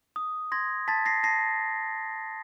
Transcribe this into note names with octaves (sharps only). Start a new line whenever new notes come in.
D#6
C6 G#6 A#6
A5 A6 B6
A#6 C7
A5 A#6 C7